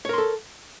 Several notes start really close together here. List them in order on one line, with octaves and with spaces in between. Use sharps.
C#5 A#4 C6 A4